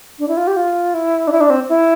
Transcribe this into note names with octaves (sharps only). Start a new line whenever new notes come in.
D4
E4
F4
G4
F4
E4
D4
E4
D4
C4
E4